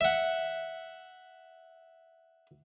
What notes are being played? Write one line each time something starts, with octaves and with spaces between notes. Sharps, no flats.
E5 F#5